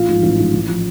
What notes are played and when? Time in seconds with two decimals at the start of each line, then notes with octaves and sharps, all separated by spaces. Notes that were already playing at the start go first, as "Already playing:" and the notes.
Already playing: A1 F4
0.08 G#2 F3
0.23 A1
0.38 G#2 F3
0.54 A1
0.69 F3